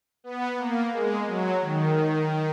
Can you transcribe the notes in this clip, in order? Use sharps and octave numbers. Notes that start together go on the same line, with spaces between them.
B3
A#3
G#3
F#3
D#3